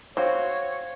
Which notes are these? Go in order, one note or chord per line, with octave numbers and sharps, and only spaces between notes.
C4 F#4 C5 C#5 F5